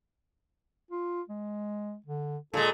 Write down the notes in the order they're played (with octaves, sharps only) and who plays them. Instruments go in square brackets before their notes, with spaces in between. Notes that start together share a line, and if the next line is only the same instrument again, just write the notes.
[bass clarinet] F4
G#3
D3
[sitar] A#2 G#3 [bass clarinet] A4